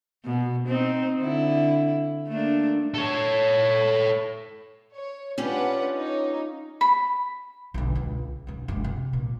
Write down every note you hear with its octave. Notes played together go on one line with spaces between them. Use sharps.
B2
C4 D#4
D3 E4
A3 A#3 D4
A4 C#5
C#5
C#4 D4 F4 G4 B4 F#5
D#4 C#5
B5
B1 D3
C#2
B1 C#4
F#1 G#3
C3
A#2